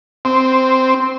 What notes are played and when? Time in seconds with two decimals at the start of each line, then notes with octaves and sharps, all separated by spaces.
0.25 C4